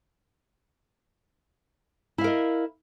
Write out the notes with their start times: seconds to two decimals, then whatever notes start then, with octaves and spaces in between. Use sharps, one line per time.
2.18 E4
2.21 F5
2.24 A#4
2.27 D#5